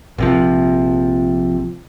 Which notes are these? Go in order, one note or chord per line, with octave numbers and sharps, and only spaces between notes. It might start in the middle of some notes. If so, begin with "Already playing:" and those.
A#1 C3 F3